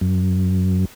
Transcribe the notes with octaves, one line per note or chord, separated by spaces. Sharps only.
F#2